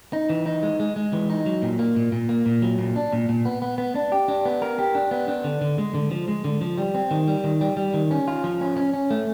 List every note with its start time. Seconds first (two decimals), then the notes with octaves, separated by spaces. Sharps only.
0.13 D#4
0.30 E3
0.46 D#4
0.63 G#3
0.80 G#3
0.96 G#3
1.13 E3
1.30 D#4
1.46 F#3
1.62 A#2
1.79 A#3
1.96 A#2
2.12 A#2
2.29 A#3
2.46 A#2
2.62 F#3
2.79 A#2
2.96 D4
3.13 A#2
3.29 A#2
3.45 B3
3.62 B3
3.78 B3
3.95 D4
4.12 G4
4.28 D4
4.45 B3
4.62 A#4
4.79 G4
4.95 D4
5.11 B3
5.28 D4
5.44 D3
5.61 D3
5.78 G#3
5.94 D3
6.11 F3
6.28 G#3
6.45 D3
6.61 F3
6.78 G3
6.95 C4
7.11 D#3
7.27 G3
7.44 D#3
7.61 G3
7.77 G3
7.94 D#3
8.11 C#4
8.28 F4
8.44 F3
8.61 C#4
8.77 C#4
8.94 C#4
9.10 A3